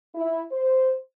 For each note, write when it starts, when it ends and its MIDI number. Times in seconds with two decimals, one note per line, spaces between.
0.15 0.41 64
0.52 0.94 72